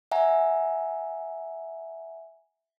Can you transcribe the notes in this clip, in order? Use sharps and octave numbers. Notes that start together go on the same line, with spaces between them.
E5 F#5 G#5 A#5